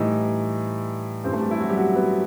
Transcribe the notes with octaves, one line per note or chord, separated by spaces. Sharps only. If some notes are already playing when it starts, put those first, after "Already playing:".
Already playing: A2 E3 G3 D#4 D#5
G2 E3 G3 C4 C5
A3 A4
G3 G4
E4
F#3 F#4
G3 G4
F#3 F#4
B3 B4